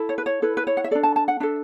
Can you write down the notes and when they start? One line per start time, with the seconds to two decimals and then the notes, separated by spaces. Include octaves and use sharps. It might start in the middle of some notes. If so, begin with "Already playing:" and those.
Already playing: E4 A4
0.09 C#5
0.18 B4
0.26 C#5
0.42 E4 A4 B4
0.57 B4
0.67 C#5
0.77 F#5
0.84 E5
0.91 D4 A4 D5
1.03 A5
1.16 A5
1.28 F#5
1.40 D4 A4 E5